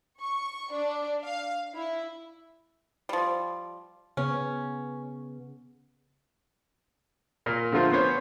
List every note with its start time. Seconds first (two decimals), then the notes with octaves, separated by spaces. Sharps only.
0.20 C#6
0.73 D4
1.23 F5
1.75 E4
3.09 F3 G3
4.17 C#3 B3 C#4
7.46 A#2 A#4
7.72 D3 F3 A3 F4 A#4 C5
7.92 B3 C#4 C5 C#5